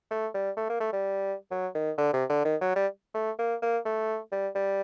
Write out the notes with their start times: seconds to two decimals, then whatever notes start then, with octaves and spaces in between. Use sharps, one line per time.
0.11 A3
0.34 G3
0.57 A3
0.70 A#3
0.80 A3
0.93 G3
1.51 F#3
1.75 D#3
1.98 D3
2.13 C3
2.30 D3
2.45 D#3
2.61 F#3
2.76 G3
3.14 A3
3.39 A#3
3.62 A#3
3.86 A3
4.32 G3
4.55 G3